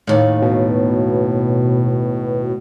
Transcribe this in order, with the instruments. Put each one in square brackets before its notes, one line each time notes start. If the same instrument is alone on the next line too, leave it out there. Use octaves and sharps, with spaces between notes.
[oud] D#2 A2
[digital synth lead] B2